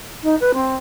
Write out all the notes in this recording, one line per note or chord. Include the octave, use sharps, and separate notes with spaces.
D#4
B4
C4